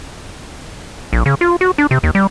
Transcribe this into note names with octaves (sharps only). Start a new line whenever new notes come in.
A#1
C#3
F4
F#4
D4
C3
D#2
G3